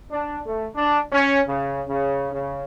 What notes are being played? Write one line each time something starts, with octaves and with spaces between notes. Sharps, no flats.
D4
A3
D4
C#4
C#3
C#3
C#3